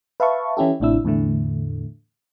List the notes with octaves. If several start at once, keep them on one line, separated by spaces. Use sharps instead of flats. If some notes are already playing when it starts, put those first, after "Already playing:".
B4 E5 F5 A5 C#6
E3 C#4 E4 G4 A4
A1 A2 C3 D4 E4 E6
E2 A2 D3 A3